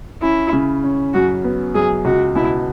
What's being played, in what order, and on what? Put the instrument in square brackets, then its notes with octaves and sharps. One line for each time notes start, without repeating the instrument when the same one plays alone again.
[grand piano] C#4 [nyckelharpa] E4
[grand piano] C#3
C#4
[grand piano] F#2 [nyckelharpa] F#4
[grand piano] B3
[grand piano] F#2 [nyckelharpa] G#4
[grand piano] C#2 [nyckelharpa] F#4
[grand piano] B2 [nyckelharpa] E4